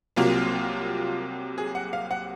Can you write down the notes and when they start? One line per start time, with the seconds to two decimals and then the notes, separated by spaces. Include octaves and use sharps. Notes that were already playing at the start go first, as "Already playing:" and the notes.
0.16 C2 C3 F#3 A#3 F4
1.58 G#4
1.75 F#5
1.93 F5
2.11 F#5